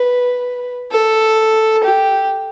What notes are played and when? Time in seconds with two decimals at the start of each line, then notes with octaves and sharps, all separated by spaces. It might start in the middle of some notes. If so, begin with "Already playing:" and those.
Already playing: B4
0.92 A4
1.84 G4